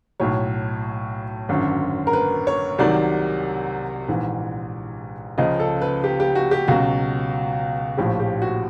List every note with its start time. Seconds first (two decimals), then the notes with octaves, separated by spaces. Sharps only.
0.20 B1 A2 F#3 C#5
1.49 G#1 F#2 D3
2.07 A#4
2.13 B4
2.47 C#5
2.78 C2 C3 D#3 F#3 D5
4.08 A#1 G#2 E3
5.38 C#2 C#3 F3 D#5
5.60 A4
5.81 B4
6.04 G4
6.20 G4
6.35 F#4
6.51 G4
6.68 C#2 B2 F#3 F#4
7.97 A#1 A2 F3 G4
8.20 G4
8.42 F#4